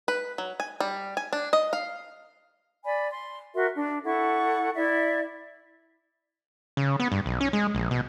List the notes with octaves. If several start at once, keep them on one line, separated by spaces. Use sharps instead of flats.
B4
F#3
G#5
G3
G#5
D4
D#5
F5
D5 G#5 B5
C6
F#4 A#4 E5 C6
D4
E4 A4 F#5 C#6
E4 D5 E5
C#3
B3
G2
B1
C#4
G#3
A#1
B2